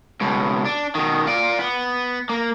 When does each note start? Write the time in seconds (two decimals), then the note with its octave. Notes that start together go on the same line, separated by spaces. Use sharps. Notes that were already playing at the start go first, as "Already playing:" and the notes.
0.21 C#2 B2
0.65 D4
0.95 B2 D#3
1.27 F4 D5
1.59 B3
2.29 A#3